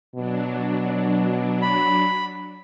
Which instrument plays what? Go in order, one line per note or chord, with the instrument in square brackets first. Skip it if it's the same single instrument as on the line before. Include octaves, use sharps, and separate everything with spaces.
[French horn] B2 [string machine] F#3 D4
[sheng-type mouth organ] B5